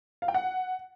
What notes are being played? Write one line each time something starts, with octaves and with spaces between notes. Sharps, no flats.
F5
G5
F#5